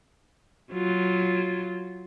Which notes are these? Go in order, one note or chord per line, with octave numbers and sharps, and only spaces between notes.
F#3 F4